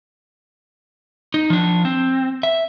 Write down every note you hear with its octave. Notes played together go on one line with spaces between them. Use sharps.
D#4
F3 D4
C4
E5